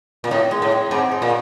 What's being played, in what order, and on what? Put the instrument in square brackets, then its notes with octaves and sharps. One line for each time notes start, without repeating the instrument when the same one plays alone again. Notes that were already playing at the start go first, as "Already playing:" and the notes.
[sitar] A#2
[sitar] A2 [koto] D#4
[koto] G#3
[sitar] A2
[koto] G#3
[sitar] G#2 [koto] C4
[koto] D#4
[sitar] A#2